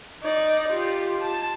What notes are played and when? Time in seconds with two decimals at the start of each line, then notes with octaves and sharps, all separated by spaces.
0.23 D#4 D5
0.68 F4 G4
1.21 A5